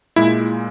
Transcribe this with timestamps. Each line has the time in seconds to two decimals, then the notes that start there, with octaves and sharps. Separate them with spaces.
0.16 A#2 G#3 E4